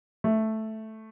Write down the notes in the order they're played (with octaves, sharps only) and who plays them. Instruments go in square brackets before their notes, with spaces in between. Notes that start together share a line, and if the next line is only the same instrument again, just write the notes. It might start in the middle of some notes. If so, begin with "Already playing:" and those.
[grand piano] A3